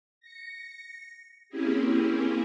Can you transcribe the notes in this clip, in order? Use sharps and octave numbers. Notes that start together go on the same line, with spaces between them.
A#6 C#7
A#3 C4 C#4 E4 G4 G#4